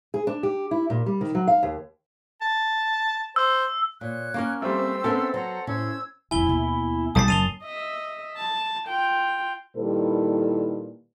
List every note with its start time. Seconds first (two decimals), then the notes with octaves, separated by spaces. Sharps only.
0.14 G#4
0.27 D4
0.43 G4
0.71 E4
0.90 A#2
1.06 G3
1.21 D#3
1.35 F#3
1.48 F5
1.63 D#2
2.41 A5
3.36 C5 E6
4.01 A#2 C#5 F#6
4.34 A#3 C#4 A#4
4.62 G3 A3 C4 C5 E5 E6
5.04 B3 C#4 A4 A#4
5.34 F#3 C5 F#5 A#5
5.67 A2 C#4 C5 E6 G#6
6.31 D#1 F2 E4 G#5 G7
6.47 D#2 B2
7.15 B1 G3 A5 D#6 A6 C7
7.28 F#1 F#2 D#7 F7 G7
7.63 D#5 E5
8.37 A5
8.87 F4 G5
9.77 A#2 D#3 G3 E4 A4 B4